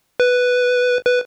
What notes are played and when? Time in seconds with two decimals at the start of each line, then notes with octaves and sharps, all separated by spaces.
0.20 B4
1.07 B4